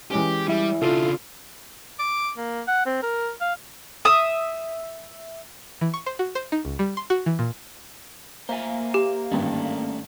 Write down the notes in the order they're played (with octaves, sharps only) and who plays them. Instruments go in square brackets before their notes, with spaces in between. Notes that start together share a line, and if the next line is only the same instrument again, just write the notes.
[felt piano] E3 G#3 C#4 [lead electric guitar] G4
[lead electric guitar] G3 [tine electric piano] E4 E5
[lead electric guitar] C#3 D4 [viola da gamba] F4 [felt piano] A4
[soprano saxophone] D6
A#3
F#5
C4
A#4
F5
[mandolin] E5 D#6
[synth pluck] E3
C#6
C5
F#4
C5
D#4
C#2
G3
C6
F#4
E3
A#2
[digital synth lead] A#3 [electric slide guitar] C5 E5 G#5
[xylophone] G4
[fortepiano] G#1 G2 D3 [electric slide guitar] A3 C#4 D4